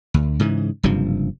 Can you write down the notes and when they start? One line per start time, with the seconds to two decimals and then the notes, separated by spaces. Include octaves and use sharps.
0.14 D2
0.40 G#2 C#3 E3
0.83 F#1 G2 C3 F3